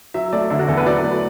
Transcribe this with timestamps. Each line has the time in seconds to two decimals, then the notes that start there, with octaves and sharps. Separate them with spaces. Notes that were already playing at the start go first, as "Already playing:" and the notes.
0.14 F#3 E5
0.33 A3 D5
0.50 D3 E4
0.59 F#4
0.68 E2 A4
0.77 B4
0.86 F#3 D5
1.04 A3